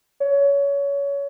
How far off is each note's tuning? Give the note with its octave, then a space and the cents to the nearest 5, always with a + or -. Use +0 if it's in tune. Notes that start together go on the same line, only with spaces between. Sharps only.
C#5 +25